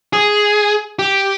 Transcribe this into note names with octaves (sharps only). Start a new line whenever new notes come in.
G#4
G4